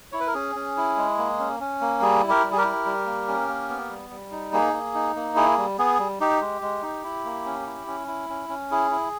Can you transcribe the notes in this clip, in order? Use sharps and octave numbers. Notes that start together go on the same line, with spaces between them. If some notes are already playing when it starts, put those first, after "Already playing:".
E4 C#5
B4
A#4
C#4 G#4
C#4
E4
G#3
A#3
C#4
C#4
A#3
G3 G#4
E4
G4 A#4
G3
G#4
G4 A#4
E4
G3
A#3
C#4
A#3
B3
G3
G3
D#4
A#3 G#4
A#3
D#4
A#3
E4 G#4
G3
B3 G#4
G3
D#4 G4
G#3
G#3
D#4
E4
A#3
C#4
E4
C#4
E4
C#4
C#4
E4 G#4
E4